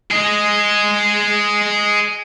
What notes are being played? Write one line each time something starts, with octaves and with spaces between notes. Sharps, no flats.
G#4 D#5